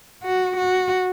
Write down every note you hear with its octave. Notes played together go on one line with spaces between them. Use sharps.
F#4
F#4